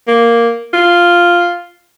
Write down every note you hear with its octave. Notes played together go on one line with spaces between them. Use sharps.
A#3
F4